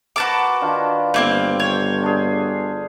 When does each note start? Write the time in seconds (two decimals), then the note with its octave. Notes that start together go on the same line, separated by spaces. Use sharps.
0.16 F#4 A#4 B4 A5 D6
0.61 D#3 D4 F4
1.14 G1 A3 A#3 C4
1.60 C#5 G5 C6
2.03 D4 G#4